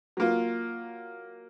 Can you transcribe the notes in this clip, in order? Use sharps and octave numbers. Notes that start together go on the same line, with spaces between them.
F#3 A#3 F4